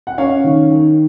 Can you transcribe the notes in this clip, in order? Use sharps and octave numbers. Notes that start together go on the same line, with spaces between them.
F#5
C#4 C#5 F5
D#3
D#3